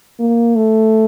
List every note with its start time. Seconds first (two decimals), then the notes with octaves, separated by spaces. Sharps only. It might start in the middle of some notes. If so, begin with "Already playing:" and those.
0.20 A#3
0.56 A3